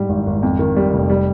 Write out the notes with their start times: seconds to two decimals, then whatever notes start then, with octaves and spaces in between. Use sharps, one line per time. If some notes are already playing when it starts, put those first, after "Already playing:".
Already playing: G#2 G3
0.09 G#1
0.26 G#1
0.43 F2
0.59 D#3
0.76 G3
0.93 F1
1.10 G3